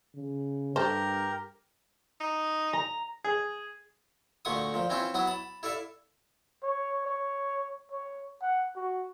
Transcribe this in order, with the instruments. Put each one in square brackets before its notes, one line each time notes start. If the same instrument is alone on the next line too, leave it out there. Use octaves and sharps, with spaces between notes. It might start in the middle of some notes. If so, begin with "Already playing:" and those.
[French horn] C#3
[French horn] G2 [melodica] G4 A#4 A#5 [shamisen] A4 C5
[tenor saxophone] D#4
[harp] A#5
[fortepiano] G#4
[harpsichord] D2 A#2 A3 C6 C#6 D#6
A#2 F3
E3 C4 C#4 E4 F4
F#3 B3 E4 D#6
A5 B5
E4 A4 D5 E5 F5
[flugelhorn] C#5
C#5
C#5
F#5
F#4